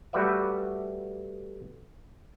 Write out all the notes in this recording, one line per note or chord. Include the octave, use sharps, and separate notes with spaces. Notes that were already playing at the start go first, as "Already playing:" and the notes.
G3 A3 F#4 B4 D5 E5